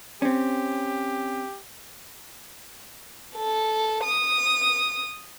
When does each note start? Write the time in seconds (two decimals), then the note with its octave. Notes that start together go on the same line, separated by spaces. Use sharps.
0.22 C4 C#4 G4
3.36 A4
4.04 D#6